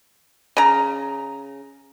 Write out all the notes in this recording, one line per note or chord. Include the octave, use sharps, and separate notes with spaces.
C#3 A#5